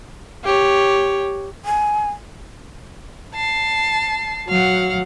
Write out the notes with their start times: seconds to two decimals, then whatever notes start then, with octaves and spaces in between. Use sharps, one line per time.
0.44 G4 C#5
1.65 G#5
3.35 A5 C7
4.49 F#3 F5 F#5